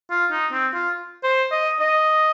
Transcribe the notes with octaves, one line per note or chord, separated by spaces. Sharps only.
F4
D#4
C4
F4
C5
D#5
D#5